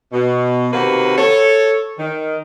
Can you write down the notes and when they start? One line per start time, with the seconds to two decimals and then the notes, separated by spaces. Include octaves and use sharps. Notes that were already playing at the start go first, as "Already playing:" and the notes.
0.12 B2
0.73 C3 D#3 A#3 F#4 B4
1.17 A4 C#5
1.99 D#3